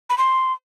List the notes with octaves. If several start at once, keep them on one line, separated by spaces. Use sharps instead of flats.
B5
C6